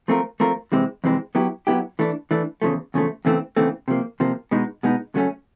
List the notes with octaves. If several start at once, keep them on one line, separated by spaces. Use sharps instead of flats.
F3 A3 C4 F4 A#4
F3 A3 C4 F4 A#4
F2 C3 E3 G#3 C4
F2 C3 E3 G#3 C4
F#3 B3 E4 G4
F#3 B3 E4 G4
E3 A3 D4
E3 A3 D4
E2 C#3 F3 A3
E2 C#3 F3 A3
E2 C#3 E3 A3 C4
E2 C#3 E3 A3 C4
C3 F3 A#3
C3 F3 A#3
B2 G#3 B3 D#4
B2 G#3 B3 D#4
C#3 F#3 A3 C#4